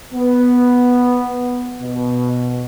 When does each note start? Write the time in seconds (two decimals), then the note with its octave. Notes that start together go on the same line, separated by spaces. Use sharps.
0.13 B3
1.80 B2